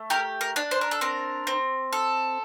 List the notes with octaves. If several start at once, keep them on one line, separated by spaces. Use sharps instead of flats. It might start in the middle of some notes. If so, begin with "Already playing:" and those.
Already playing: A3
G4 A#4
A#4
D4
C5
A#4
A4
C4 A#4
C4
A4